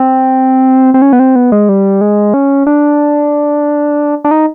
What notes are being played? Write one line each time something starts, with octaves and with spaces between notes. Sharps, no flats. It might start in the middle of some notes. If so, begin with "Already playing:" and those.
Already playing: C4
C4
C#4
B3
C4
B3
G#3
G3
G#3
C#4
D4
D4
D#4